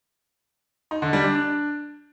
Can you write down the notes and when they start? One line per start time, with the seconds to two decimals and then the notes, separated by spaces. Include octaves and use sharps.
0.91 D#4
1.02 D3
1.13 G3
1.24 D4
1.35 D4